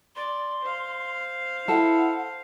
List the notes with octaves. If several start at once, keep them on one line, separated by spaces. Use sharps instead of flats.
D5 C6
C5 F5
E4 A4 F#5